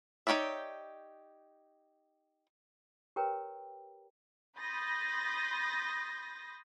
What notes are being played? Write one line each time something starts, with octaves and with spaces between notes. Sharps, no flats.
D#4 G4 C#5 D5 E5
G4 A#4 B4 C#5 G5 A#5
B5 C6 D#6 G6 A6 A#6